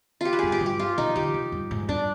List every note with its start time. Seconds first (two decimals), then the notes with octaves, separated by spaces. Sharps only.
0.21 F4 G4
0.33 B4
0.39 G2 G#4
0.52 G4
0.61 G2
0.66 G4
0.79 F4
0.98 B2 D#4
1.16 D3 G4
1.34 C3
1.52 G2
1.71 G#2
1.88 G2 D4